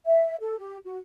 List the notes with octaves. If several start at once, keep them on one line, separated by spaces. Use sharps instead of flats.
E5
A4
G4
F#4